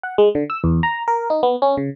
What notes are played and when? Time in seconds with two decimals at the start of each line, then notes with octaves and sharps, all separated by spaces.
0.03 F#5
0.18 G#3
0.35 D3
0.50 E6
0.64 E2
0.83 A#5
1.08 A#4
1.30 D#4
1.43 B3
1.62 C#4
1.77 C#3